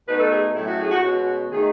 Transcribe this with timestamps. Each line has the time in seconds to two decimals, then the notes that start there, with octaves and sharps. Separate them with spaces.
0.08 B2 A3 D#4 B4
0.20 A4
0.32 G#4
0.55 A2 F#3 A3 C#4 E4
0.68 F#4
0.80 G#4
0.91 F#4
1.03 B2 G#3 C#4 F#4
1.51 D#3 A3 D#4 G#4